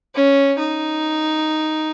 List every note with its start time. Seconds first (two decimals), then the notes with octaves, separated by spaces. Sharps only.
0.15 C#4
0.59 D#4